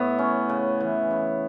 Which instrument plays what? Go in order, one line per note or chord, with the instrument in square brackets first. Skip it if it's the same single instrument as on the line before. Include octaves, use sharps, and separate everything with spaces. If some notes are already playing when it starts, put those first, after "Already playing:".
Already playing: [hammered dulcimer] A2 [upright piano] B3
[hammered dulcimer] C#4
C#3
E3
C#3